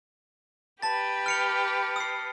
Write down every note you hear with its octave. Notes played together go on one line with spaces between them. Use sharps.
G4 B4 A5 A6
F6 C#7 F7
D#6 C7